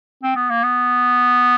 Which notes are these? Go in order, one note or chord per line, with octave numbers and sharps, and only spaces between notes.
C4
B3
A#3
B3